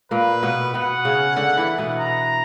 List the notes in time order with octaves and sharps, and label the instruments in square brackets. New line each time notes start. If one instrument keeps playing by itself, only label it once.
[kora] A#2 A#3 [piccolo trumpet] B4
[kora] B2 B3
[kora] B2 B3 [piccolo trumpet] F#5
[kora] C#3 C#4
D3 D4
E3 E4
B2 B3
[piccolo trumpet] A#5